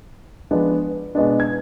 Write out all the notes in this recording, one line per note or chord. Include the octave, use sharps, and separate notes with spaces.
F3 G#3 B3 D4
B2 G#3 B3 D4
G#6